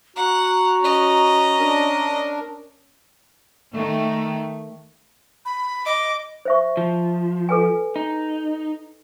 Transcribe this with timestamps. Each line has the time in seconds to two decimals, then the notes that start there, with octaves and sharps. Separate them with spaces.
0.16 F#4 F#5 A#5
0.81 C#4 D#5
1.60 D4 A#4
3.73 D#3 A3
5.45 B5
5.86 D#5 D6
6.45 C5 E5 C#6
6.77 F3
7.49 A4 B4 G#5
7.96 D#4